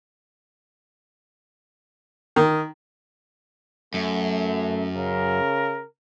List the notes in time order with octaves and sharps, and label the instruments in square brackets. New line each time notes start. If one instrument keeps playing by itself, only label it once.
[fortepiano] D#3
[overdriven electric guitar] F#2 [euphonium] A3
[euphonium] C#3 [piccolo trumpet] A#4